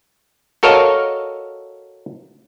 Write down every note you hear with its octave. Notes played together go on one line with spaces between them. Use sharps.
F#4 A4 A#4 C#5 D#5 F5